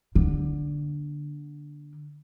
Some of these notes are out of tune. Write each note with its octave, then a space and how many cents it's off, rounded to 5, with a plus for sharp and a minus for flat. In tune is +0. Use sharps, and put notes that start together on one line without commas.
D3 +0 A#3 +35